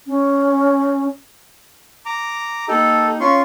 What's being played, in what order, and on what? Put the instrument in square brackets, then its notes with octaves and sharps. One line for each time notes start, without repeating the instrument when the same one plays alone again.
[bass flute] C#4
[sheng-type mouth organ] A#5 D6
[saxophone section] A#3 D#4 G4 [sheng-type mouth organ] A4
[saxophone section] C#4 [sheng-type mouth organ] F4 C6 C#6